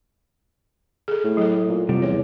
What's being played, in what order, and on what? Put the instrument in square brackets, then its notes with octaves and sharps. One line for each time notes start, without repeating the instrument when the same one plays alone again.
[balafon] G#4 A4
[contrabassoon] A2
[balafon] F#3 A4
[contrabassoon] A#2
[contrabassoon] F2 [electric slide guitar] C3 G3 G4 [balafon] G#3
[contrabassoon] E2 [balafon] C#5